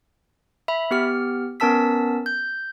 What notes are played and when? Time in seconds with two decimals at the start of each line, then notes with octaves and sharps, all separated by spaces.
0.68 E5 B5
0.91 B3 G4 F6
1.60 B3 C#4 A#4 A5 E6 B6
2.26 G6